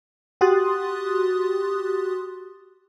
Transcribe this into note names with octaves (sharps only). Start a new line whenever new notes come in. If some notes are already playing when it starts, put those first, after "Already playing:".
F#4 G4 C6 D#6 F#6 A6